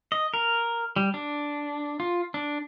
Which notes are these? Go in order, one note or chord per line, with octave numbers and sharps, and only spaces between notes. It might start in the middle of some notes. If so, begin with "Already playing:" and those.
D#5
A#4
G3
D4
F4
D4